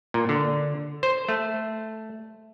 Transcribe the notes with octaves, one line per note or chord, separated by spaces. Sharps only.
A#2
D3
C5
A3